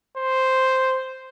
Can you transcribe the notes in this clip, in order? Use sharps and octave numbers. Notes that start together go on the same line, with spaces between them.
C5